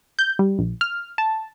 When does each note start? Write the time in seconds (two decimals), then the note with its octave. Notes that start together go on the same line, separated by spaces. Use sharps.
0.19 G6
0.39 G3
0.59 A#1
0.81 F6
1.18 A5